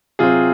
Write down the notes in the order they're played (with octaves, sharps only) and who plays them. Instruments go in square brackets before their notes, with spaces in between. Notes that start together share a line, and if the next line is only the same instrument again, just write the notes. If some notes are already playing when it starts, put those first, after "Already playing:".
[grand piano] C3 F#3 C4 F4 G#4